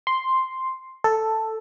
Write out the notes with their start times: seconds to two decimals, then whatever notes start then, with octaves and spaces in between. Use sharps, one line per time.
0.07 C6
1.04 A4